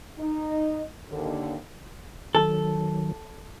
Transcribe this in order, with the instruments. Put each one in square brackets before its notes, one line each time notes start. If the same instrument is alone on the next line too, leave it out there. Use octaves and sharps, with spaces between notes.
[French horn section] D#4
D#2 D3
[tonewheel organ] D#3 F#3 [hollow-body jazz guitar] A4